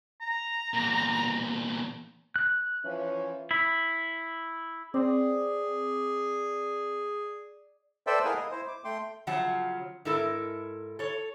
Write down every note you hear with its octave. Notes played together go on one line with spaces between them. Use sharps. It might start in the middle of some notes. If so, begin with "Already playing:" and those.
A#5
E2 A#2
F#6
E3 F3 C#4
E4
C4 G#4 D5
A4 B4 C5 D5 E5 G5
E4 G#4 A#4 F5 F#5 G#5
D#5
E4 C5
D6
A3 G5 C6
C#3 F3 F#3 F#5 A5
G#2 E4 A4 A#4
A4 C#5